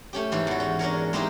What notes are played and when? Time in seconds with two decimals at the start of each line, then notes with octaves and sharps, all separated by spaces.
0.13 A3 C#4 G4
0.32 G#2 E3 G4
0.47 E2 F#4
0.60 C#4
0.79 C#4 D4 A#4 C#5
1.13 G#3 A#3 C4 D#4 E4 G4